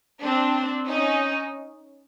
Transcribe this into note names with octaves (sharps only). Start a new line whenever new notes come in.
C4 D4
C#4 D#4